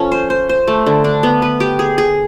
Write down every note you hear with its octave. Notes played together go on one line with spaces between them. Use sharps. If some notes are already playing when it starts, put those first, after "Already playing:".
Already playing: F3 C#4 A4
C5
C5
C5
A3
D3
D4
B3
B4
G4
G#4
G#4